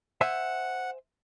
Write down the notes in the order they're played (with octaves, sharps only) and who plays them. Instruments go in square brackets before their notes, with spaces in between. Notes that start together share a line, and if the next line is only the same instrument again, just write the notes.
[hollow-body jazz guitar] C5 E5 G#5 [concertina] F#5